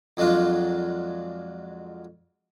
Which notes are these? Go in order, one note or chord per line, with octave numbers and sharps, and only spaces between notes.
F2 F#3 G#3 D4 F4